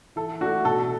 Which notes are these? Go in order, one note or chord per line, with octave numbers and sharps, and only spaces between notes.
E3 A4
A3 D4 F#4
B2 A4